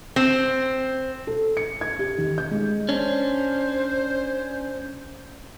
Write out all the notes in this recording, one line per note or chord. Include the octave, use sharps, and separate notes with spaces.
C4
A4
C#7
G#6
G4
D#3
G6
G#3
C#4 D4 C5